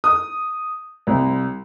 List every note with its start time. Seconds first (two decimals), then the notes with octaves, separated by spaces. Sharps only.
0.04 D#6
1.07 C2